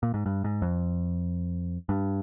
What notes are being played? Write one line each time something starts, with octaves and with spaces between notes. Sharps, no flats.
A#2
G#2
G2
G#2
F2
G2